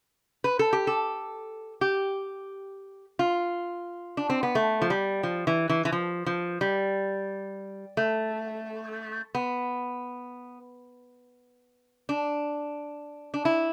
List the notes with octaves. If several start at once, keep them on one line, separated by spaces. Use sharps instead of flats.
B4
A4
G4
A4
G4
F4
D4
C4
B3
A3
F3
G3
F3
E3
E3
E3
F3
F3
G3
A3
B3
D4
D4
E4